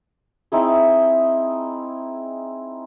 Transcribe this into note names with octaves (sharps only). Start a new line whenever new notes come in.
C4 D#4 E4 G#4